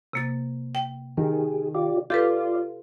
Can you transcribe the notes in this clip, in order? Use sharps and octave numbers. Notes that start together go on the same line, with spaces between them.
C3 A#3 A6
G5
D#3 G4 G#4
F4 G4 D5
F4 G4 A4 B4 D5